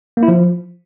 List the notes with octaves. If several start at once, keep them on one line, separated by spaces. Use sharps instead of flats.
A#3
E4
F3